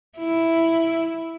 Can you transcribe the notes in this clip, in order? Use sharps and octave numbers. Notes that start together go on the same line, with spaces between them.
E4